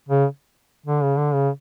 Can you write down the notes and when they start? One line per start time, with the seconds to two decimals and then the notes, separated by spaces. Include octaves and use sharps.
0.09 C#3
0.86 D3
1.02 C#3
1.18 D3
1.33 C#3